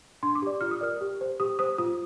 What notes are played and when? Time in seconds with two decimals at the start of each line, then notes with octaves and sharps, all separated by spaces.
0.23 D4 C6
0.35 D6
0.42 G4 D5
0.61 F4 F6
0.71 D#6
0.81 A#4 D5 F6
1.01 G4
1.21 C5
1.40 G4 D#6
1.59 C5 D#6
1.78 F4 D#6